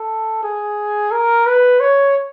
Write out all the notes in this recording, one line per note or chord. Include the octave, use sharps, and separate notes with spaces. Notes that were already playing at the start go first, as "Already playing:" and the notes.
Already playing: A4
G#4
A#4
B4
C#5